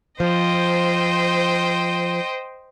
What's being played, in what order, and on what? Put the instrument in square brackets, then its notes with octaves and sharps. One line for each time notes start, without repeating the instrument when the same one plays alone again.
[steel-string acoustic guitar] F3 [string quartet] C5 D#5 G5